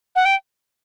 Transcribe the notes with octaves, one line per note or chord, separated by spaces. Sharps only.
F#5
G5